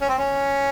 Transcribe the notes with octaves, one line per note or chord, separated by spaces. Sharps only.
C#4
C4
C#4